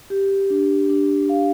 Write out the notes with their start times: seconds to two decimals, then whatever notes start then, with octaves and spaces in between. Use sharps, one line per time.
0.10 G4
0.50 D4
0.89 D4
1.29 F5